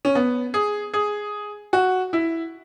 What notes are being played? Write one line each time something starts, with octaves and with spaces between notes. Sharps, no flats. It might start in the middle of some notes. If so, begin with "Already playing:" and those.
C#4
B3
G#4
G#4
F#4
E4